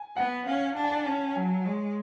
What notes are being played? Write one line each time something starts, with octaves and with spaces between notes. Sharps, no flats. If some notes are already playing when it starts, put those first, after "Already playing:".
Already playing: G#5
B3 F#5
C#4 F5
D4 A5
G#5
A5
C#4 A5
F#3 G#5
G#3 C#5